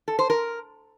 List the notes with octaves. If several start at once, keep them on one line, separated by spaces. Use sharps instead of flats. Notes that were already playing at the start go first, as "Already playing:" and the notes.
A4
C5
A#4